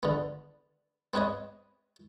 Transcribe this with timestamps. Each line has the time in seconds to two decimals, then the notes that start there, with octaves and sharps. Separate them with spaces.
0.03 D3 B3
1.14 B3 C4 B4 C#5 D#5